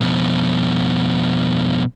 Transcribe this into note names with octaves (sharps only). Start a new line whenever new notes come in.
F2 B2